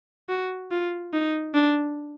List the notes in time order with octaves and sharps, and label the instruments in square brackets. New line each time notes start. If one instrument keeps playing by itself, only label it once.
[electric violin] F#4
F4
D#4
D4